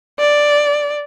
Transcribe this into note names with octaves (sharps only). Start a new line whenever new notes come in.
D5